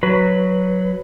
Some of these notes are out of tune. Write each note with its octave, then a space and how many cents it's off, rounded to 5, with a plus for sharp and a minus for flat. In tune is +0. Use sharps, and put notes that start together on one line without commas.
F#3 +0 B4 +5